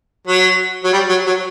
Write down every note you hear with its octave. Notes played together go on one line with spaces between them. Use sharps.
F#3
F#3
G3
F#3
F#3